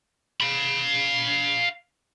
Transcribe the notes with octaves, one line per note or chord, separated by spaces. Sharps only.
F5 B5